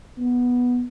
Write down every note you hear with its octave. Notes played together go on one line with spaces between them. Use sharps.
B3